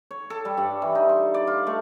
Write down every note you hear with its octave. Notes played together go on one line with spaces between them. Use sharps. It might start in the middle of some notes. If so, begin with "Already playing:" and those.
C#5
A4
G3
G2
E3
D#4
C6
D5
F4
A3